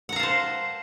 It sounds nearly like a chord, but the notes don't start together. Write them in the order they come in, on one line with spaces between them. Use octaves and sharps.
F#5 A#5 F5 A5 C5